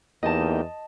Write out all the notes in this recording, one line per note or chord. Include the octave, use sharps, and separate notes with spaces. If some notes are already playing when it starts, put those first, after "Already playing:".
E2 A#3 D#4 G4 D#5 A5